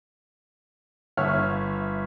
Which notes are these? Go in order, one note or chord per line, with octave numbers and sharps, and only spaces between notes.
G1 C#5 E5 F6